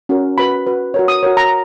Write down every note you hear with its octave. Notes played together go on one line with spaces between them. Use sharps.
C#4 F#4 A#4
F#4 B4 B5
F#4 B4
F#4 A#4 C#5
D#6
F#4 A#4 C#5
A#5